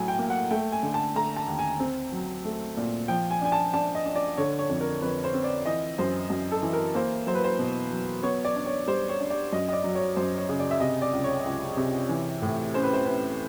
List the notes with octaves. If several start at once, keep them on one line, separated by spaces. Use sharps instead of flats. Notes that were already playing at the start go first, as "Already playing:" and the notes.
Already playing: A2 F#3 G#5
G5
A#3
F#5
A3 G5
G#5
D3
A5
A3 A#5
A5
D#2
G#5
C4
F#3
A3
A#2
F3 G5
G#5
D4 G#5
A5
D4 A5
D#5
D4
D5
D3 C#5
C#5
F2
A#4
F2 B4
C5
C4
D5
E3 D#5
F#2 C5
F#2
A4
E3
A#4
A#3 C5
F#3 C5
B4
C5
B2
F#3
B3 C#5
D5
D4
C#5
G3 C5
C#5
D4
D5
F#2 D#5
D#5
D5
F#3
C#5
F#2 C5
C#5
C#3
D5
E5
C3 D#5
D5
C#2
C#5
C#2
C3
E3
A2
C#4 C5
B4
C5
C#4 B4